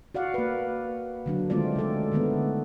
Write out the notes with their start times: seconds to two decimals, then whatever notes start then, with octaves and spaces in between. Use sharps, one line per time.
0.15 F#4 D5 F5 F#5
0.34 A#3 B4
1.26 D3 F#3 D4
1.50 D#3 G#3 A3 C4 F4 D5
1.76 C#3 D#4 A4 D5
2.12 D3 D#3 A3 B3